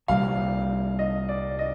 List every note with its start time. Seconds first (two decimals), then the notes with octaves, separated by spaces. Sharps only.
0.08 C2 A#2 G3 F5
0.99 D#5
1.29 D5
1.59 D#5